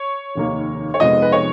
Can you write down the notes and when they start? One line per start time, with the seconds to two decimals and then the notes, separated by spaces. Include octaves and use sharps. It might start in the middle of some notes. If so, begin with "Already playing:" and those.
Already playing: C#5
0.35 F1 D#2 D#3 A#3
0.94 C#5
1.00 F1 F2 F3 G#3 B3 D#5
1.22 B4
1.32 C#5